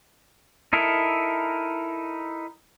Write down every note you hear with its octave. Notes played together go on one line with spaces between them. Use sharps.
D#4 E4 A4 A#4